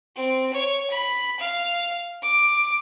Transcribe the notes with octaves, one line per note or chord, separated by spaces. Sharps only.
C4
C#5
B5
F5
D6